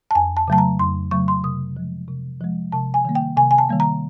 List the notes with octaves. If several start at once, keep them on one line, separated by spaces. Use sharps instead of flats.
A5
F2 G#5
A5
C#3 F#3 A3 A5
A#5
F2 C6
C#3 F#3 A3 C#6
C6
C3 D#6
F3 G#3
C3
F3 G#3
C3 A5
G#5
D#3 G3 A#3
G5
C3 G#5
G#5
A5
D#3 G3 A#3
A#5